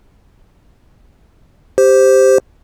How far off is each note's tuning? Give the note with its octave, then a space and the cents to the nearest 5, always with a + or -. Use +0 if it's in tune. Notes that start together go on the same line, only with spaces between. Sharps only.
G4 +0 C5 +0